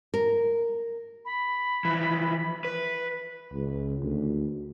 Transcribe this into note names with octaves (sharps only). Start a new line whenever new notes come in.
A#4
B5
E3 F3
B4
C#2
D2